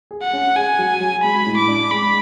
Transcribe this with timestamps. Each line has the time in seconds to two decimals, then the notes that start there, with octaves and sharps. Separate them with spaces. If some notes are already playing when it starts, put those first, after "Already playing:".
0.11 G#4
0.23 F#5
0.33 C#4
0.56 G#4 G#5
0.79 F#3
1.01 F#3
1.23 G#3 B5
1.46 A2
1.57 D6
1.68 D4
1.91 G#3 B5